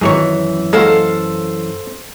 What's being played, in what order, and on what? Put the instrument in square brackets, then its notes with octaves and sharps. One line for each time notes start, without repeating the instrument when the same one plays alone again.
[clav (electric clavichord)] G#1 D#4 G#4 [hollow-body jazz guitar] F#2 E3 C#5
[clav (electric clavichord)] G#3 A#3 F#4 [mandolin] A4 C5 F5